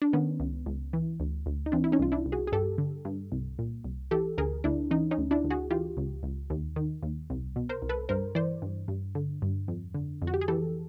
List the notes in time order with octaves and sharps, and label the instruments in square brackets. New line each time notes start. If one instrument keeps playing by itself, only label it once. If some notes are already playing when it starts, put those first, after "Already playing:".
[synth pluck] D4
D#3 B3 C#4
C#2
C#2
E3
D2
D2
D#4
E3 C4 D4
E4
C#4 D#4
C2 F4
D4 E4
C2
F#4 G#4
G#4
G2 G4 A4
D3
G2
C2
A#2
C2
E3 G4 A4
D2 G#4 A#4
D2 D4 E4
E3 C#4 D#4
C#4 D#4
D2
D4 E4
D2
F#4 G#4
E3 F4 G4
C#2
C#2
D#2
D#3
D#2
C2
B2
A#4 C5
C2
A4 B4
G2 A#4 C5
E3 C5 D5
G2
G2
D3
G2
F2
D3
F2
F#4
G4
G#4
E3 G4 A4